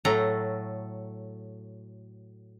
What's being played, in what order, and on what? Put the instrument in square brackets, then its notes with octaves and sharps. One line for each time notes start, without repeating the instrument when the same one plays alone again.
[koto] A2 F#3 A4 A#5